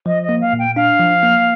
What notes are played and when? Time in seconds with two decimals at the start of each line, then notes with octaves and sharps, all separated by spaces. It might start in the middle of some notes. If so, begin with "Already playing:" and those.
0.06 F3 D#5
0.23 D#5
0.29 A#3
0.41 F5
0.53 A#2
0.59 G5
0.76 D4 F5
0.99 F3
1.23 A#3